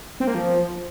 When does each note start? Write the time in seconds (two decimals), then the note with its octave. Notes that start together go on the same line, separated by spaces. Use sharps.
0.20 C4
0.27 A#3
0.35 F3